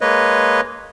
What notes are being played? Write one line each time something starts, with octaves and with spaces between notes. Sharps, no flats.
G#3 A#3 B4 C#5 D#5